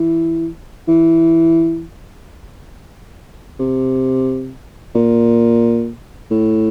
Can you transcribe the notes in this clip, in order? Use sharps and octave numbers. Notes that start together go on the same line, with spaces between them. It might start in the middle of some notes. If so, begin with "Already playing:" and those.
Already playing: E3
E3
C3
A#2
A2